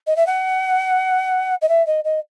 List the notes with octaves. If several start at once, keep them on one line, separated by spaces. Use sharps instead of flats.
D#5
E5
F#5
D#5
E5
D#5
D#5